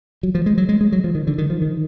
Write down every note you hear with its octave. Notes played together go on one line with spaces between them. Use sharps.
F#3
F3
G#3
F#3
G#3
G#3
F#3
F3
D#3
D3
D#3
F3
D#3